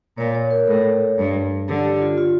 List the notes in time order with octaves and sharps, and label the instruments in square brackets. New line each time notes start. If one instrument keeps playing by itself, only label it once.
[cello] A#2 [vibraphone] C#5
[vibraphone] C#5
A#4
[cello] A2 [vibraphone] A4
[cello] G2
[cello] D3 [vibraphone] G4
[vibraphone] G4
F4
F4